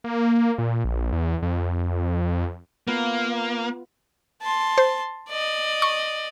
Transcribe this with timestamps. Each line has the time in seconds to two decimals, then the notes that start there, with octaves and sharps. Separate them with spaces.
0.04 A#3
0.58 A#2
0.84 A#1
1.12 E2
1.42 F2
2.87 A#3 B3 F4
4.42 A5 C6
4.78 C5
5.29 D5 D#5
5.82 C#6